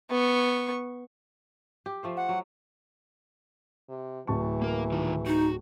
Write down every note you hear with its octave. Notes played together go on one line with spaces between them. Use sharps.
B3 C#6
G4
F3 A3 C5
F#5
F#3
C3
D1 E3 A5 C#6
A#3 A#4
D#3 D#4 F4
D#4 F#4